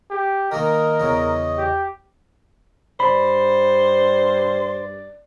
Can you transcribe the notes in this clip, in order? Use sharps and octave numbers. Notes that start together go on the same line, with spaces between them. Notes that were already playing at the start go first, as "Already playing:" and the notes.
G4
D#3 A#3 A#4 D#5
E2 C#3
G4
G2 C5 D5 B5